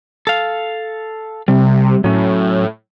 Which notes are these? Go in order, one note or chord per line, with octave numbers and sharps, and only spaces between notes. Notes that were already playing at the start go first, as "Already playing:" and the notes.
A4 F5
C3 G3
A2 F#3 C#4